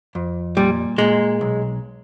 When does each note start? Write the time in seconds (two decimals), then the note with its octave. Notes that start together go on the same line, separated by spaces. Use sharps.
0.15 F2
0.57 A#2 G3
0.98 A#2 G#3
1.41 B1